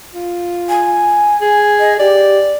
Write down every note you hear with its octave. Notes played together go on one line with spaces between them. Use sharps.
F4
G#5
G#4
D#5
G4 D5